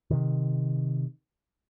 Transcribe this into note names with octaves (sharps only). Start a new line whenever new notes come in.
C3 D#3